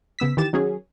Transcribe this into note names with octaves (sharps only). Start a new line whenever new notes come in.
C#3 B3 E6 B6
D#3 E3 G4 A6 E7
D#3 F#3 C#4 G#4